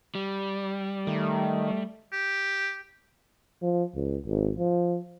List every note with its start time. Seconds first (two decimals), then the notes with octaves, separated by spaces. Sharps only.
0.15 G3
1.07 D#3 A3
2.12 G4
3.62 F3
3.94 C#2
4.26 G#1
4.58 F3